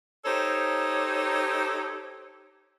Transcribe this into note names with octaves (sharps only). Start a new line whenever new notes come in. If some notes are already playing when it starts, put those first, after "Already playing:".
D#4 G4 A4 C5 C#5